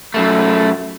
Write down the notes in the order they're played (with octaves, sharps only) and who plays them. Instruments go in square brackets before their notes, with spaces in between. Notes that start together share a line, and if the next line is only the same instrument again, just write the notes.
[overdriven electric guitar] F#2 A3